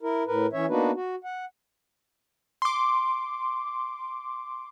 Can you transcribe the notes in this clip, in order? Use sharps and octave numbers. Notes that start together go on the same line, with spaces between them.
E4 A#4
A2 A#4 B4
E3 C#4 C#5 E5
A#3 B3 D4 D#4 F#4 B4
F#4
F#5
C6 D6